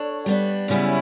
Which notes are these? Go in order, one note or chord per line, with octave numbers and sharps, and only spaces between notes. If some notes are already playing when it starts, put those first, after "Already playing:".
Already playing: D4 A4 C#5
G3 B3 D4
F#2 C#3 G3 B3 C#4 E4